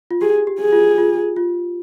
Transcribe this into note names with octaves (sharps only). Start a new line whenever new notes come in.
F4
G4 G#4
G4
G#4
F4
F4
F4